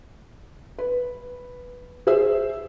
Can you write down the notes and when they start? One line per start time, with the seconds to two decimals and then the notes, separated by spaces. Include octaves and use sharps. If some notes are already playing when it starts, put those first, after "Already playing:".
0.78 B4
2.07 G#4 C5 E5 E6